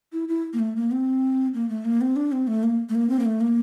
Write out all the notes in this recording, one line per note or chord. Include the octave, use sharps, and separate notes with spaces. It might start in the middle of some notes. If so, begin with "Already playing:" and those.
E4
E4
A#3
A3
A#3
C4
A#3
A3
A#3
C4
D4
C4
A3
A#3
A3
A#3
C4
A#3
A3
A#3